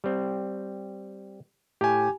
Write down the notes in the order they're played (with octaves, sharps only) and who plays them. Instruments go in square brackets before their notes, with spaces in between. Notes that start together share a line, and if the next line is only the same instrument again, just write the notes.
[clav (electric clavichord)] G3 C4
[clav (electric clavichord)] A2 [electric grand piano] G4 G#5